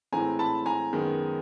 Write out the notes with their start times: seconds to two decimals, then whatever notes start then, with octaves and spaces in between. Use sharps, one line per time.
0.12 A2 E3 G#3 C4 G#5 A#5
0.39 A5 B5
0.66 G#5 A#5
0.93 F#2 D#3 G#3 B3